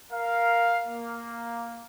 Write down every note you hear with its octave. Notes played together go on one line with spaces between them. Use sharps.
A#4 F5
A#3